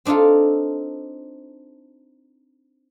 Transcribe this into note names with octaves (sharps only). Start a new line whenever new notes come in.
C4 D4 D#4 F4 A4